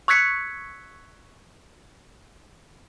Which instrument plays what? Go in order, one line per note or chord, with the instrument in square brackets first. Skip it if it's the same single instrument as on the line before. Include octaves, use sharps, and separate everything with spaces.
[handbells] C#6 E6 F#6 G#6 B6 C#7